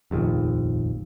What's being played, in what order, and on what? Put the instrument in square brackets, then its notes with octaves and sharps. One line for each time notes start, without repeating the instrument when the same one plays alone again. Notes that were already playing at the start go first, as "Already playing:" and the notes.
[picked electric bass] F1 A#1 D#2